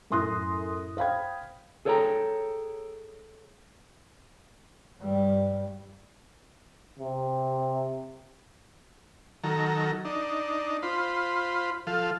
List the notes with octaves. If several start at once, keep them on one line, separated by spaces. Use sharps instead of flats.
F#2 A2 C6 D#6 F#6 A#6
C5 F5 G5 B5 G#6
G#4 A4 C#5 D5 G5 A#5
G2 G3
C3
D#3 F#3 A4 A#5
D4 D#4
F4 C5 B5
F3 A4 F5